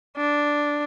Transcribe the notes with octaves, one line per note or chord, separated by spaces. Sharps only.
D4